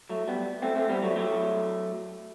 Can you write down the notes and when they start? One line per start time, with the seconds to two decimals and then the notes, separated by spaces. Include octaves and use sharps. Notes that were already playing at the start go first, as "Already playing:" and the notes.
0.09 F#3 A3
0.28 G3 B3
0.62 A3 C4
0.76 A3 C4
0.89 G3 B3
1.03 F#3 A3
1.16 F#3 A3